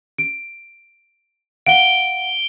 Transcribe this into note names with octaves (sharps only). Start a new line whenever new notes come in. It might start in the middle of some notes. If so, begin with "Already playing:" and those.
D7
F5 F#5 D7 G7